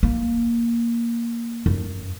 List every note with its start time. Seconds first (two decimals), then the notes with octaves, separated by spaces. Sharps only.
0.03 A#3
1.66 F#2